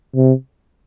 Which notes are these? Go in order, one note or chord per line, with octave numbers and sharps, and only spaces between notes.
C3